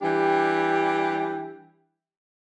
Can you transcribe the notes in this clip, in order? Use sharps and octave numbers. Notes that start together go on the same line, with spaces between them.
E3 G3 D4 G4